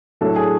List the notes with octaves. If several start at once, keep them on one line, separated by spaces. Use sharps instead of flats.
A2 F#3 A3 D4 A4
G#4